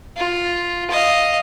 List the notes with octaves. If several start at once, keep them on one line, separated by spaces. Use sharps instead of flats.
F4
D#5 F5